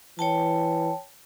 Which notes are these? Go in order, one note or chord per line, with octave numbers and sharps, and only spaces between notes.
E3 C#5 G5 A5